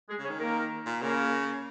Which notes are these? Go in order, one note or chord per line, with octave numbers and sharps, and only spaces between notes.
G#3 G#4
C#3
C#4 C#5
D#3
A#3 A#4
A#2
C#3 A#3 A#4